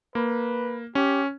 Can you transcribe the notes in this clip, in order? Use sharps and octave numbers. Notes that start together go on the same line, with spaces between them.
A#3 B4
C#4 G4